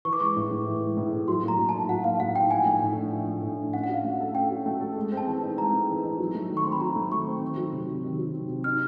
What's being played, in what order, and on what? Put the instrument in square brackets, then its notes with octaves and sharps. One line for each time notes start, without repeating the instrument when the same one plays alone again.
[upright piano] E3 [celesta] C#6
[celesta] D6
[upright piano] G#3 [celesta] C#6
[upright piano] A2
A2
E3
G#3
A2
A2
[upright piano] F#3 [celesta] C6
[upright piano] A#3
[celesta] A#5
[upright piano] A2
[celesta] A5
[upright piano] D#4
[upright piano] F#3 [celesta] F#5
[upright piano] A#3 [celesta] F5
[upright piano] A2 [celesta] F#5
[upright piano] D#4 [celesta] G5
[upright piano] F3 [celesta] G#5
[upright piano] A3
A2
D4
F3
A3
A2
D4
[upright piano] C#4 [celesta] F#5
[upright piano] F#4 [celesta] F#5
[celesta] F5
[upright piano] A3
A4
[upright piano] C#4 [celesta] G5
[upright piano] F#4
A3
A4
G#3
C4
[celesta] A5
[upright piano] E3
D#4
[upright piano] G#3 [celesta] A#5
[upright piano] C4
E3
D#4
F#3
A3
D#3
[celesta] C#6
[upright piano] C4 [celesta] C6
[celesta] B5
[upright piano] F#3 [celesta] A#5
[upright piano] A3
[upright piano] D#3 [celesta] C#6
[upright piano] C4
D#3
F#3
C3
C3
D#3
F#3
C3
C3
[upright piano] D#4 [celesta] F6